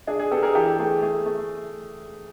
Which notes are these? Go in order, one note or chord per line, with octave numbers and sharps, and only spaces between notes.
D4 G#4
G#4
B3 G4 A4
G#4 A#4
E3 G4 A4
A3 G#4
A3 G#4
A3